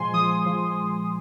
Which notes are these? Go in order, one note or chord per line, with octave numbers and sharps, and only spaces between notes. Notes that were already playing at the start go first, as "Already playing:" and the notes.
Already playing: A#2 F3 G#3 G#5 C6
F3 D#6
F3